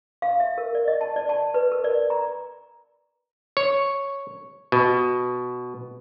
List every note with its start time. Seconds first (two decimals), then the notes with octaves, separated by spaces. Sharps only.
0.22 F5
0.40 E5
0.58 A#4
0.75 D5
0.88 D#5
1.01 A5
1.16 D5
1.29 A5
1.54 B4
1.72 A#4
1.84 D5
2.10 A#5
3.57 C#5
4.72 B2